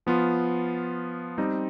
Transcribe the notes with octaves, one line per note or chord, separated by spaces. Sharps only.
F3 B3 F4
G3 C4 D#4